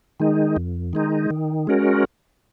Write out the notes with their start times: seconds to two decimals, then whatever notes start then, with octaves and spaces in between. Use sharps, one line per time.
0.20 D#3 G#3 D#4
0.56 F2
0.93 D#3 G#3 D#4
1.30 D#3
1.67 G#3 C#4 F#4 A#4